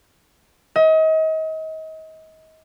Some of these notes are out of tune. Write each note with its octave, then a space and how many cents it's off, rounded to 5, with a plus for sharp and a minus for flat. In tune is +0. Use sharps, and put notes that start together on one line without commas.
D#5 +35